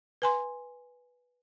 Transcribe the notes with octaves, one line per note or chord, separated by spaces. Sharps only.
B4 G#5 C6